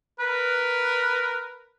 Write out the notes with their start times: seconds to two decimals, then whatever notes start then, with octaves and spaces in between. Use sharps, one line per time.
0.20 A#4 B4